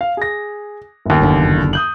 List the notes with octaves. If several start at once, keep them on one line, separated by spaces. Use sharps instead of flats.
F5
G#4 A#6
G1 D#2
F#1 D3
D#6 G6 F#7